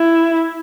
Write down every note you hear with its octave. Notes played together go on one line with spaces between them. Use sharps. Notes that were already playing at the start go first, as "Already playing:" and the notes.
Already playing: E4